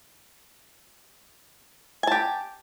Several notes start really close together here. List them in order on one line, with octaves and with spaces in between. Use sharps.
G#5 A5 G4